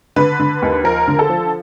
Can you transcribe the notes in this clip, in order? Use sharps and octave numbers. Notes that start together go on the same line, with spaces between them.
D3 B4
D3
D#2
F3 A#4
D3
A4
F3